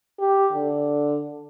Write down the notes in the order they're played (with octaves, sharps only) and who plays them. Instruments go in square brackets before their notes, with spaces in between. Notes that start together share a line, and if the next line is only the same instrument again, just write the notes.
[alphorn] G4
D3